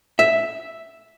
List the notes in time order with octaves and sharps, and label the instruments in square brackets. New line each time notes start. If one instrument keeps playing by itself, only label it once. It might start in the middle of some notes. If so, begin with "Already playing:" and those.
[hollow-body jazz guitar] E5